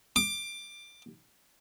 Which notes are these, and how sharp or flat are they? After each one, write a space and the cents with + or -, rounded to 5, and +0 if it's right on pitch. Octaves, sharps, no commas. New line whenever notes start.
D6 +15